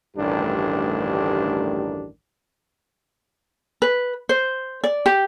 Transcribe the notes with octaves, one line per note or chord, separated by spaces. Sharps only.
A1 D2 G2 D#3 D4 G4
B4
C5
D5
G4